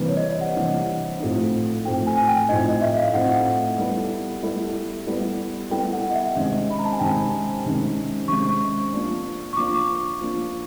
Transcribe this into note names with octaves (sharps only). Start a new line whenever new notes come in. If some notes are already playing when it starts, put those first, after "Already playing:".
Already playing: C3 E3 G3 A#3 D4 B4
C#5
D#5
D5
F#5
C3 E3 G3 A#3 D4 F#5
A2 F3 A3 C4 D#4
A2 F3 A3 C4 D#4 G5
G#5
G#5
G5
A2 F3 A3 C4 D#4 D#5
D#5
E5
F5
A2 F3 A3 C4 D#4 F#5
G3 B3 E4 A4
G3 B3 E4 A4
G3 B3 E4 A4
G3 B3 E4 A4 G5
F#5
D#5
E5
E5
C3 D#3 G#3 C#4 D#5
B5
A#5
A5
G#5
C3 D#3 G#3 C#4 G5
C3 D#3 G#3 C#4
C3 D#3 G#3 C#4 C#6
F3 A#3 D4
C#6
F3 A#3 D4 D6
F3 A#3 D4